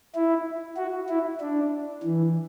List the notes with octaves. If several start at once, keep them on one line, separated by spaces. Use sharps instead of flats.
E4
F#4
E4
D4
E3